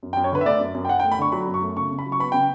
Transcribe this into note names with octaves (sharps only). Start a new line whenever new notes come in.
F#2
G5
F#2
C#5
D3 B4
E5
A3 D5
F#2
F#2
G5
F#2 F#5
G5
A3
B5
D3 C#6
F#3 B5
F#2
C#6
A3
C#3 C#6
C#3
B5
F#3
C#6
B3 B5
C#3 G5